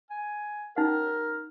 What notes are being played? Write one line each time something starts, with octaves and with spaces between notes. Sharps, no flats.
G#5
C#4 D#4 A#4 F#5